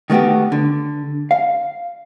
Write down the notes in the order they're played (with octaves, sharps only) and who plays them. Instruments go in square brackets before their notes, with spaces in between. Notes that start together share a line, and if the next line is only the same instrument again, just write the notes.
[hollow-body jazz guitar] D#3 A3 B3 F#4 G4
D3
F5